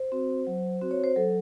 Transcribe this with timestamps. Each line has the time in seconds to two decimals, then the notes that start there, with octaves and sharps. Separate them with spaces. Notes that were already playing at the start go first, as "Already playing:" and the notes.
Already playing: C5
0.12 C4 F#4
0.47 F#3
0.81 C4 F#4
0.91 C#5
1.04 C5
1.16 F#3 A4